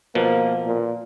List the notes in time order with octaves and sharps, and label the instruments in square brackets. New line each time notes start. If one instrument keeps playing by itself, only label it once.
[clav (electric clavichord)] B2 F3 [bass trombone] A#3
[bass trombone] A#2